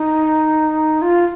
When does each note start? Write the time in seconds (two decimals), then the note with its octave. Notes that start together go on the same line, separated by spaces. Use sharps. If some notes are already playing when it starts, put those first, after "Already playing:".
Already playing: D#4
1.01 F4